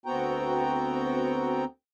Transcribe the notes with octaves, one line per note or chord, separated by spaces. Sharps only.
D2 B3 C4 F#4 G5 A#5